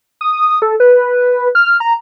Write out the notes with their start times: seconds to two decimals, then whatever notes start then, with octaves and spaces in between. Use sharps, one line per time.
0.21 D#6
0.62 A4
0.80 B4
1.55 F6
1.80 A#5